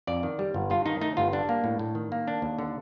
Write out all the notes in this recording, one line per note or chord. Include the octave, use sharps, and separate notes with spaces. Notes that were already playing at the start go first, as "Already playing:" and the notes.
F2 D5
D#3
G3
G1
G2 F4
D#3 D#4
A3 D#4
G1 F4
G3 D4
A#3
A2
A2
D#3
A#3
D4
D#2
D3